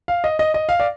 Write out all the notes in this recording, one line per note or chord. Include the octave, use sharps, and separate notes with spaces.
F5
D#5
D#5
D#5
F5
D5